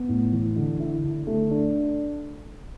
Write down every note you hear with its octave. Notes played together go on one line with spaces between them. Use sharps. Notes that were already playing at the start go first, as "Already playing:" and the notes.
Already playing: B3
A2
E3
D3
E4
D3
A3
D4